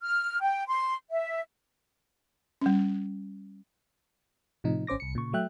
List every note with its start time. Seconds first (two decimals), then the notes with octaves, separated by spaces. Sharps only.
0.02 F6
0.41 G5
0.68 C6
1.11 E5
2.61 G3 C#4
4.64 A2 C3 F3 D#4
4.87 G#1 C#4 C5 D6 A#6
5.00 C2 C#7
5.15 A#2 C#3 C#6
5.33 F#3 A3 E5 G5 F#6